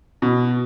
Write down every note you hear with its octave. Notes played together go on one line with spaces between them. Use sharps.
B2